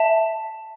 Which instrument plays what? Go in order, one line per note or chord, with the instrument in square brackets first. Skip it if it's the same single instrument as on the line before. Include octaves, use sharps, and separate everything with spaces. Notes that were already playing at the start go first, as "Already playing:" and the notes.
Already playing: [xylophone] E5 A5